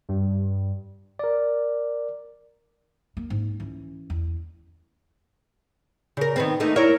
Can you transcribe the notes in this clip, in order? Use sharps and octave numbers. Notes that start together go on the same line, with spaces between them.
G2
A#4 D5
A#3
G#2
E3 C#4
E2
C#3 A#4
D#3 B3 C4
A3 A#3 D#4
E4 A#4 C#5